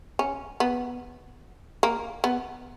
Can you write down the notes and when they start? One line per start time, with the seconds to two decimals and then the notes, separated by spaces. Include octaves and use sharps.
0.19 C#4
0.60 B3
1.83 A#3
2.24 B3